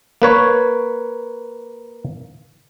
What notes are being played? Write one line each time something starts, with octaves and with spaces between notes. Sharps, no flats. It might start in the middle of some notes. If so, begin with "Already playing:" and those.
A#3 B4 C#5